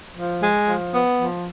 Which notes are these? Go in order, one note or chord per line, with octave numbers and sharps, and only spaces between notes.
F3
G#3
F3
B3
F3